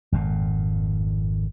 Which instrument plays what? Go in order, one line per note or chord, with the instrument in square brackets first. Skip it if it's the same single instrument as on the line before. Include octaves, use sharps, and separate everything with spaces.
[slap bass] G#1 F2 A#2